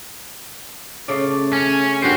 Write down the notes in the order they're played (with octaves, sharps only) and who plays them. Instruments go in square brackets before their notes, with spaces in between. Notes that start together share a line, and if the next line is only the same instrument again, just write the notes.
[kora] C#3 A3 D5
[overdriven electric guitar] C#4
[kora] G2 F#4 A#4 [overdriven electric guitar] C4